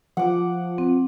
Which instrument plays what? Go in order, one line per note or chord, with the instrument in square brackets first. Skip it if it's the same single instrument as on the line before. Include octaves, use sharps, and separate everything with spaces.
[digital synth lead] F3 [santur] F#5 D6
[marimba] C4